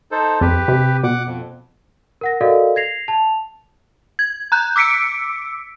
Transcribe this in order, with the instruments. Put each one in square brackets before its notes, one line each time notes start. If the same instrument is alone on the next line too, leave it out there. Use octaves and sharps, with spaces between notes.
[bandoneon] D#4 A4 C5
[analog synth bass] F2 [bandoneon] G4 B4
[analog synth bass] C3
[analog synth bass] B2 [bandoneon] F#5 D6
[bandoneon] F2
[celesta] A#4 F#5 A#6
F#4 A4 A#4 D5 D#5 F5
G#6 A#6 C7 F7
A5 F7
[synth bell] G#6
A#5 F#6 G6
D6 E6 B6 C#7 D7